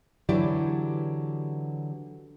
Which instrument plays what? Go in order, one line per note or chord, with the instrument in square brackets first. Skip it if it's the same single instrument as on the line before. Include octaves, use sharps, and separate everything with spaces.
[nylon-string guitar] D3 E3 F#3 E4 G4 D5